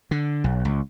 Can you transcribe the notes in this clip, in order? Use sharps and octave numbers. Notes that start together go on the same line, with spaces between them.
D3
B1
C#2